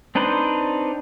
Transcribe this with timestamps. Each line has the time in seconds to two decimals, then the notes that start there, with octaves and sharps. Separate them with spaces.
0.15 C4 D4 D#4 B4 C5